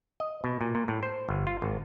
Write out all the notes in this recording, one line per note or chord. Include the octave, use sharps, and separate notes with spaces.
D#5
B2
A#2
A#2
A2
C5
G1
F4
G#1